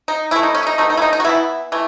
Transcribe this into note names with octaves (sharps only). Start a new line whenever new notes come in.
D#4
E3 A3 E4
D#4
C#4
E4
D#4
B2 A3 D#4
D#4
E4
D#4
D#4
F#4
E3 B3 E4
E3 A3